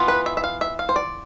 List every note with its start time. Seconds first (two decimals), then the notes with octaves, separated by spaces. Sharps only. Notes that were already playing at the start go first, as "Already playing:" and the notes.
Already playing: E3 B3 F4
0.08 B4
0.26 E5
0.37 E5
0.44 F5
0.61 E5
0.79 F5
0.89 C5
0.96 D5